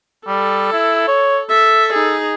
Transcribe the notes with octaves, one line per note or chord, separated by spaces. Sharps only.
G3 A4
E4
C#5
A4 E5
D#4 G#4